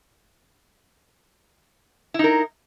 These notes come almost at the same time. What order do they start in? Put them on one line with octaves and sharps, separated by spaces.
E4 D#4 A#4